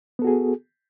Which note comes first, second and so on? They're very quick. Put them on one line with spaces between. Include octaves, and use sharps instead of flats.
B3 A4 F#4 G#4